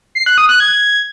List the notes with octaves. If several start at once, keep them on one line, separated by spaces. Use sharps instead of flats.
C7
F#6
D#6
F#6
G#6